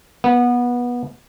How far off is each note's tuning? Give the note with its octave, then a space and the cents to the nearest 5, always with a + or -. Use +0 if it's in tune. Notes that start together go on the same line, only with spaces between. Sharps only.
B3 -20